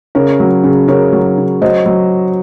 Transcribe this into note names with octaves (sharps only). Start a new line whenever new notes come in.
C#3 A#4 C#5
F#3
C#3
C#3 A#4 C#5
F#3
C#3
F#3 C5 D#5
F#3